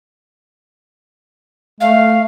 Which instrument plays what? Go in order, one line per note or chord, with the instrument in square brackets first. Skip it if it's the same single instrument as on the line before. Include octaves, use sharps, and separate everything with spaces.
[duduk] A3 [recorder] F5